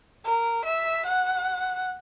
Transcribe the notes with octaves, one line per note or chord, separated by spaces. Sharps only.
A#4
E5
F#5